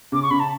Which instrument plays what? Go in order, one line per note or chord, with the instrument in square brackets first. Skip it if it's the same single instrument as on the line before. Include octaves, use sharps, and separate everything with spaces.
[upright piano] C#3 [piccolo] D6
[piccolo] C#6
[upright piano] C#3 [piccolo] B5
[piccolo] A5